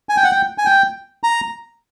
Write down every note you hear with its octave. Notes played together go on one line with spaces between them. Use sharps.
G#5
G5
F#5
G5
G#5
G5
A#5